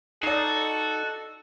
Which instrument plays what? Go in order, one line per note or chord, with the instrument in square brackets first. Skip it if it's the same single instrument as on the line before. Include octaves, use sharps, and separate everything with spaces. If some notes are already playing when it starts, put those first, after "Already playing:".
[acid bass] D#4 [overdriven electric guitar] F#4 [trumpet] A4 [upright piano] D5 C7